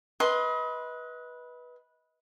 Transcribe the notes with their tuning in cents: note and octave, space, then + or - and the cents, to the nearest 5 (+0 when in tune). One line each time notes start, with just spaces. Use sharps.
B4 -10 D#5 +35 C6 +0